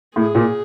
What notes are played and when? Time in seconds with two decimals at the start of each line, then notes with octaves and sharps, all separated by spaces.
0.16 A2 G#4
0.35 A#2